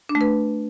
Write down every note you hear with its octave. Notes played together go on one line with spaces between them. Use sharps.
D4
A3
B4